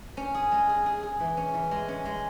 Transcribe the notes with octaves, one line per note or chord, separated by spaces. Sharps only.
C#4
G#4
G#3
G#4
G#4
G#4
E3
C#4
E3
G#3
C#4
G#3